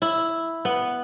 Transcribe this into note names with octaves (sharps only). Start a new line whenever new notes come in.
E4
B3